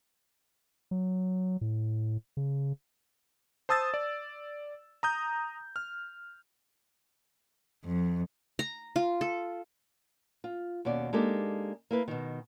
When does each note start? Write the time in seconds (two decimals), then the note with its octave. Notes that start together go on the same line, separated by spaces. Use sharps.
0.91 F#3
1.61 A2
2.37 C#3
3.69 C5 A5 D#6 E6 A6
3.94 D5
5.03 A#5 D#6 G6
5.76 F6
7.85 F2
8.59 A#5
8.96 F4
9.21 A4
10.44 F4
10.85 D#2 B2 C#4 D5
11.13 G#3 A#3 D4 D#4 G4 A4
11.91 A#3 E4 B4
12.08 B2 D#3